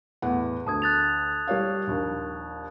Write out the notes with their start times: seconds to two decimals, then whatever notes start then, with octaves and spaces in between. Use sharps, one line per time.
0.22 E2 A2 F#5
0.67 D2 A5 D#6 G#6
0.82 F#6 A6 F7
1.47 G3 C#5 F5
1.87 A#1 D#2